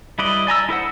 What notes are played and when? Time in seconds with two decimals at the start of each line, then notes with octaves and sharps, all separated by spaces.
0.19 G3 E4 B4 D5 D#5
0.47 D5 G#5 A#5 E6
0.69 E4 A4 C5 F#5